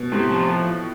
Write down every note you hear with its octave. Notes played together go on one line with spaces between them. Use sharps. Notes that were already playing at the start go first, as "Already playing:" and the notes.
Already playing: B2
A2 C3
F3